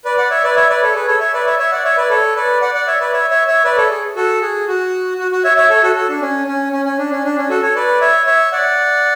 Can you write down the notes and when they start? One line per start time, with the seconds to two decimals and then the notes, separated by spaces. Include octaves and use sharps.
0.05 B4 D5
0.17 D5 F#5
0.31 C#5 E5
0.43 B4 D5
0.56 C#5 E5
0.69 B4 D5
0.82 A4 C#5
0.94 G#4 B4
1.07 A4 C#5
1.20 C#5 E5
1.33 B4 D5
1.46 C#5 E5
1.59 C#5 E5
1.71 D5 F#5
1.84 C#5 E5
1.97 B4 D5
2.10 A4 C#5
2.36 B4 D5
2.61 D5 F#5
2.74 D5 F#5
2.87 C#5 E5
3.00 B4 D5
3.13 C#5 E5
3.30 C#5 E5
3.48 C#5 E5
3.64 B4 D5
3.77 A4 C#5
3.91 G#4
4.16 F#4 A4
4.42 G#4
4.67 F#4
5.19 F#4
5.31 F#4
5.44 C#5 E5
5.57 C#5 E5
5.70 A4 C#5
5.83 F#4 A4
5.95 F#4 A4
6.09 D4
6.21 C#4
6.47 C#4
6.72 C#4
6.85 C#4
6.99 D4
7.11 C#4
7.24 D4
7.37 C#4
7.49 F#4 A4
7.62 A4 C#5
7.75 B4 D5
8.00 C#5 E5
8.26 C#5 E5
8.52 D5 F#5